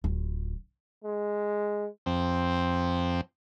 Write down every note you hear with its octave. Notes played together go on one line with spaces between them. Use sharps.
D1 F4
G#3
F2 C4